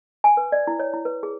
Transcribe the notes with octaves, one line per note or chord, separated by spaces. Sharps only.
G#5
B4
D5
E4
C#5
E4
B4
G#4